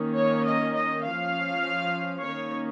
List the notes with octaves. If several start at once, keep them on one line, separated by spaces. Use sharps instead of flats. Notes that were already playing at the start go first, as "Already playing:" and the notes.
Already playing: D#3 A#3 C#4
C#5
D#5
D#5
F3 C#4 F5
D#3 A#3 C#4 C#5